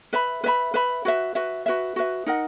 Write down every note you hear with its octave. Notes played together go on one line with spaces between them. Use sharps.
B4 E5 B5
B4 E5 B5
B4 E5 B5
F#4 B4 E5
F#4 B4 E5
F#4 B4 E5
F#4 B4 E5
D#4 A#4 D#5 F#5